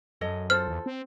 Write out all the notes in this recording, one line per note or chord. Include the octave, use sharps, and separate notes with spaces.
F#2 A4 C#5 D#5
F4 A4 C5 F6
E2
C4